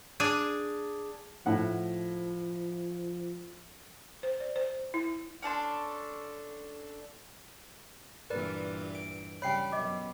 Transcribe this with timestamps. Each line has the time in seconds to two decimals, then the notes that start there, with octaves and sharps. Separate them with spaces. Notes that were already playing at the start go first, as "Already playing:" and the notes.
0.20 D4 G#4
1.46 A2 F3 F#5
4.23 C5
4.40 D5
4.56 C5
4.94 E4
5.42 C#4 D4 A4 C6
8.30 G2 A#2 E3 A#4 B4 D5
8.95 D7
9.42 C#3 G3 C#5 D5 G5 B5 C7
9.72 F#2 B2 D#5 D6